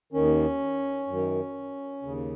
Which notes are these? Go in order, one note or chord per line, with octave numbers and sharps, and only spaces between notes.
D#2 D#3 C#4
F#2 D#3
D#2 C#3